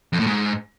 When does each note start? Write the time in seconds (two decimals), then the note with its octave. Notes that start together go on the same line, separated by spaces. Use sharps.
0.13 F2
0.20 A2
0.27 G#2